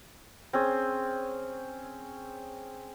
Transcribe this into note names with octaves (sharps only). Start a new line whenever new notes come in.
C4 C#4 G#4